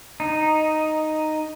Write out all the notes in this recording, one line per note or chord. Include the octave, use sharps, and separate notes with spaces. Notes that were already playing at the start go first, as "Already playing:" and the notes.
D#4